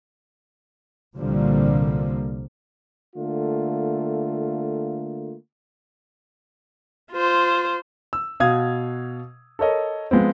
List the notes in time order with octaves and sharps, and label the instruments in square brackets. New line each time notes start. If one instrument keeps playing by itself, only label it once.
[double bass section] C2 A#2 D3 F3 G3 A#3
[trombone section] D3 A3 A#3 F4
[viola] F4 C5
[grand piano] E6
B2 F5 D#6 G#6
A4 A#4 C#5 D#5
F3 G#3 B3 C4